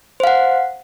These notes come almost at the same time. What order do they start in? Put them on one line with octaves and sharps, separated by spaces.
C5 F5 F#5